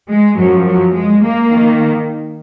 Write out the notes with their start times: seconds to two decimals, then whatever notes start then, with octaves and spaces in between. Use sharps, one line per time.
0.10 G#3
0.38 F#2 F3 F#3
0.66 F#3
0.95 G#3
1.23 A#3
1.51 D#3